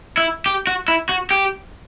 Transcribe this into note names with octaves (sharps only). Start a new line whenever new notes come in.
E4
G4
F#4
E4
F#4
G4